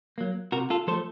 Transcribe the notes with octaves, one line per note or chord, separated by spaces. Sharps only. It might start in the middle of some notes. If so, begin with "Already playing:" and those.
F#3 A#3
C3 F#4 A#4
F4 A4
F3 A3 A4 C5